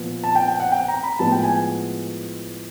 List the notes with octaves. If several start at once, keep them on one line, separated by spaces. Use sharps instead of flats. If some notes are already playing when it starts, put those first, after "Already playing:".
Already playing: A#2 F3 B3
A5
G5
G5
F#5
G5
A#5
B5
A2 F3 G#3 B3 A5
G5
G#5